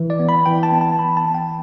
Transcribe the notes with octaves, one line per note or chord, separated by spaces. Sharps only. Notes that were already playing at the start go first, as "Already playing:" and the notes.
Already playing: E3
D5
B3
B5
E3 G5
A5
B3
A5
E3 B5
A5
B3
G5